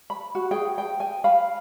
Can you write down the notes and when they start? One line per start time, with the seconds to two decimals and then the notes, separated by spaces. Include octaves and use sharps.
0.10 B5
0.35 F#4
0.51 G#4 G5
0.78 G5
1.00 G#5
1.24 F5 B5